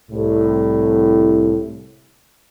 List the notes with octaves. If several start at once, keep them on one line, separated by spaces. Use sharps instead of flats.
C2 A2